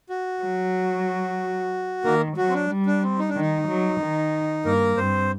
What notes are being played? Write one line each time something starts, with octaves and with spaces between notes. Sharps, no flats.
F#4
F#3
D#3 A#3 A#4
F#3 F#4
C4
D4
G3
D4
C4
D#4
D4
D#3
D#4
F#3
D#3
G2 A#3 A#4
G2 C4 C5